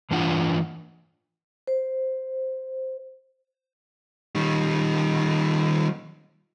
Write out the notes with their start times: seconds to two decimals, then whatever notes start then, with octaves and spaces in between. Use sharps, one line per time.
0.11 G2 E3 D4 F4 F#5
1.67 C5
4.35 D#3 G3